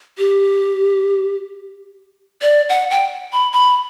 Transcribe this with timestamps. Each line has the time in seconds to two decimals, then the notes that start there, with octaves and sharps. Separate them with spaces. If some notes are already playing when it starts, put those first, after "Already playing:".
0.18 G4
2.42 D5
2.69 F#5
2.91 G5
3.33 B5
3.53 B5